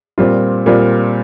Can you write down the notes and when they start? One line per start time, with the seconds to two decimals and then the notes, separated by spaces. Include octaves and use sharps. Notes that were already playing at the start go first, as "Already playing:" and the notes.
0.18 A#2 G3 C4 F4
0.66 A#2 G3 C4 F4